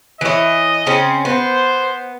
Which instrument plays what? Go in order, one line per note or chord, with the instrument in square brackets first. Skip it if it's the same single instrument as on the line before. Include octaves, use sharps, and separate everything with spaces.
[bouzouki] E3 C#5 [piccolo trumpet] D#5
[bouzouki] C#3 C4 C#4
[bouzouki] B3 [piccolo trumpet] C5